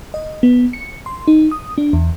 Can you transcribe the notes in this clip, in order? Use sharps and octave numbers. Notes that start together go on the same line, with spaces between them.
D#5
B3
C#7
C6
D#4
D#6
D4
E2